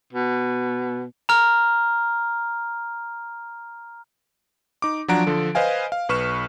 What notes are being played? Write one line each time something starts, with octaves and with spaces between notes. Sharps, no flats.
B2
A#5 F6
D#4 D6
F3 F#3 D4 F#5 A#5 D7
D3 F3 A4
B4 C5 D#5 F5 G#5
F5
B1 B4 C#6 F6 E7